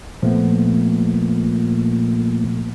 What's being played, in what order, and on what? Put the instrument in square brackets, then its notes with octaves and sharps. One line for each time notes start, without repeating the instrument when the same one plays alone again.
[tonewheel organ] A#2 [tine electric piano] F3 A3 B3